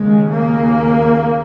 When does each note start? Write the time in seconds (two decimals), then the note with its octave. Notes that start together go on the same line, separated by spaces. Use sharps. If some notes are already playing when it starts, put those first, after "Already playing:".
Already playing: D#2 C#3 G#3
0.30 A#3